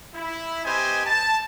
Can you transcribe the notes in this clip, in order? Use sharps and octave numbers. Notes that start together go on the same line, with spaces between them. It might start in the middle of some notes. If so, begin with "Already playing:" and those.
E4
C4 G4 B4 C5 D#5 G#5
A5